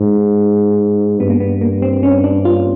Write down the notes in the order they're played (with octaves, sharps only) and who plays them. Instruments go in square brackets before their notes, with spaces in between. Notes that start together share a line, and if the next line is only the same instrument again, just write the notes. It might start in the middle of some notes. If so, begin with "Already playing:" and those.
Already playing: [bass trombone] G#2
[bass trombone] G2 [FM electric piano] B3
[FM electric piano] A#3
B3
A#3
C4
C#4
D4
F4